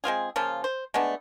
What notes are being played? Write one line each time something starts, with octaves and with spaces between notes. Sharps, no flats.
G#3 C4 F4 G#4
C#3 F3 A#3 F4
C5
G#3 A3 B3 D4